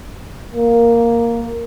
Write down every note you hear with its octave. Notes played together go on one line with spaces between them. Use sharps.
A#3